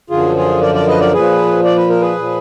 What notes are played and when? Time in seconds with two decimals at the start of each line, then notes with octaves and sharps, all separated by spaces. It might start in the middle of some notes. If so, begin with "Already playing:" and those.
0.10 F#2 D3 F3 F4 G#4
0.36 F4 G#4
0.62 A#4 D5
0.74 A#4 D5
0.87 B4 D#5
1.00 A#4 D5
1.14 A#2 F3 G#4 B4
1.65 D5
1.77 B4
1.89 A#4
2.01 G#4 B4
2.17 A#2 F3